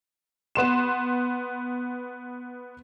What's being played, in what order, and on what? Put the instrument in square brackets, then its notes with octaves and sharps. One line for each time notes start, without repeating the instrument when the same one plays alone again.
[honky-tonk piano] B3 C6 E7